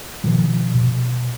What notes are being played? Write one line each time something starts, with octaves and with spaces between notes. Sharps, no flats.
B2 D#3 F3
B2